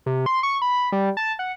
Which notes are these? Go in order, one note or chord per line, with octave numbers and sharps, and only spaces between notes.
C3
C6
C#6
B5
G3
A5
F#5